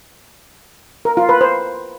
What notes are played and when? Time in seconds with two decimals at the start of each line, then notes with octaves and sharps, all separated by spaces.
1.05 A#4
1.17 F4
1.29 B4
1.41 C5